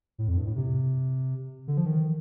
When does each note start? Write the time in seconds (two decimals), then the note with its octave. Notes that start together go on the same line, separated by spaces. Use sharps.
0.18 A2
0.28 F2
0.38 G2
0.46 A2
0.56 C3
1.68 D3
1.77 F3
1.86 D#3